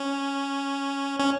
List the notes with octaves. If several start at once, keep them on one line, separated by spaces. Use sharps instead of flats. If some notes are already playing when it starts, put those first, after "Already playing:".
Already playing: C#4
C#4